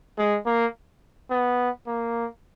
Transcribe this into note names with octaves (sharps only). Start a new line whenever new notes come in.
G#3
A#3
B3
A#3